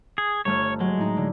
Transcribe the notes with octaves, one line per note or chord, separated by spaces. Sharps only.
G#4
G1 A3 C#5 F6
F#3 G#3
A2 D#4
D3